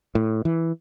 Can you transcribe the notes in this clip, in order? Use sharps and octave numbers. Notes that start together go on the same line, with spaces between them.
A2
E3